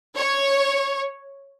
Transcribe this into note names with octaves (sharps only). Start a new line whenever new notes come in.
C#5